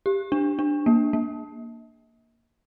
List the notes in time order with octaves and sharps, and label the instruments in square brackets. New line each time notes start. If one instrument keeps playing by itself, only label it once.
[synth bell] G4
D4
D4
A#3
A#3